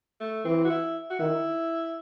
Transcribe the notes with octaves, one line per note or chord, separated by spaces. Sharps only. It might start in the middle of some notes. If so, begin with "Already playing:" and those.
A3
E3 C4
F#4
E4
F#4
D#3 E4